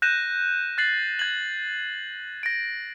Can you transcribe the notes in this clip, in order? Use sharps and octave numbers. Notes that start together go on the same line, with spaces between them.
F#6 G6 A#6 D#7 E7
F#6 A6 C7 F#7
G#6 F#7
A#6 D7